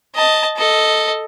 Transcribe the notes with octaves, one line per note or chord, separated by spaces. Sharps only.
D#5 A5
A4 D#5